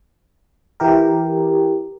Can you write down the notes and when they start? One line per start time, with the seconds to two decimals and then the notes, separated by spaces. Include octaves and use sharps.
0.80 E3 G4 A#4